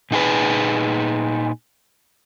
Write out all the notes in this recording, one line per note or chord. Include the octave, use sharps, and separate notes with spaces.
A#2 D#4 G#4 B4